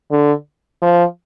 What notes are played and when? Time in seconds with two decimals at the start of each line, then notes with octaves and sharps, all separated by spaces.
0.11 D3
0.82 F3